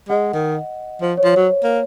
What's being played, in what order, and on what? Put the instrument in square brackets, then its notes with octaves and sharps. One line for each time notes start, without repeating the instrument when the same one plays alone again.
[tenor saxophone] G#3 [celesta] D#5 F#5
[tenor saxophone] D#3
[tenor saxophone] F3 [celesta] C5
[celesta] C#5
[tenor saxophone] F3
[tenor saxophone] F#3 [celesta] C#5
[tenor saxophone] A#3